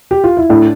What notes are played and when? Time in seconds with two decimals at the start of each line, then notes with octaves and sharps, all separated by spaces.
0.11 G4
0.24 F4
0.37 E4
0.49 A2 D4